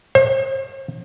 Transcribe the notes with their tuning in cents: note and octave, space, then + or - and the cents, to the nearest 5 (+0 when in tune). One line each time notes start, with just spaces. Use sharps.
C5 +40